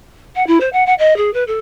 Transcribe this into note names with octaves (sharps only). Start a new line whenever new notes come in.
F#5
E4
C5
F#5
F#5
D#5
G#4
B4
A4